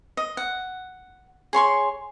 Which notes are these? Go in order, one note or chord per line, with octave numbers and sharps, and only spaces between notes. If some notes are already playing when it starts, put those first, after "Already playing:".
D#5
F#5
G#4 C#5 C6 C#6